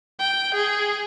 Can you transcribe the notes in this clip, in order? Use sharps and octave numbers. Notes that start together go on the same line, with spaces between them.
G5
G#4